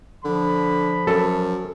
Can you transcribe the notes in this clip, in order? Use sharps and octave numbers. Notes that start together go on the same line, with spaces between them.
D3 F3 B5
F#2 A4